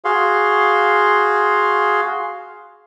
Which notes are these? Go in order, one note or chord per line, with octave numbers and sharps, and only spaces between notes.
F#4 G#4 F5 C6